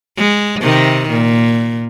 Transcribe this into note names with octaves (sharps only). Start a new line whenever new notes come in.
G#3
C3 D#3
A#2